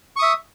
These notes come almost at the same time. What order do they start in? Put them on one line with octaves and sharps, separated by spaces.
C#6 D#6 E5